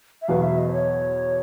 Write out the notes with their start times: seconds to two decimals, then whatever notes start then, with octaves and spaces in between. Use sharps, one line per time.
0.22 E5
0.28 E2 B2 F#3 B3 F5
0.43 E5
0.58 D#5
0.68 C5
0.72 C#5